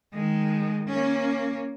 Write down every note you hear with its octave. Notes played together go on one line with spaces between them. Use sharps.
D#3 G#3
A#3 C#4